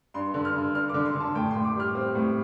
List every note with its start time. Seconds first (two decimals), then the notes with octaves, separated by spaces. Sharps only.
0.14 G2 C6
0.34 D3
0.45 F6
0.55 G2
0.74 G2 F6
0.89 D3 D6
1.05 C6
1.15 D3
1.20 A5
1.35 A2 G5
1.51 A2 C6
1.65 D6
1.75 G3 F6
1.95 C4
2.15 A2